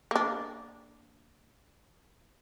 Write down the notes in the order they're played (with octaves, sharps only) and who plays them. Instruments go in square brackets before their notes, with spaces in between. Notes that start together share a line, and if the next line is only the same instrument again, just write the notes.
[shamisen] A#3 D4